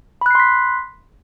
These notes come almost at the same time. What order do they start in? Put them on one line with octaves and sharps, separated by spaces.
B5 F#6 C7 C6 B6